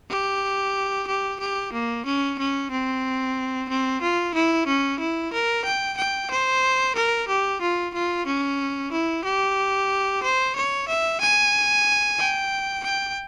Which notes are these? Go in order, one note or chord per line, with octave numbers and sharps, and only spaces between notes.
G4
G4
G4
A#3
C#4
C#4
C4
C4
F4
E4
C#4
E4
A#4
G5
G5
C5
A#4
G4
F4
F4
C#4
E4
G4
C5
C#5
E5
G#5
G5
G5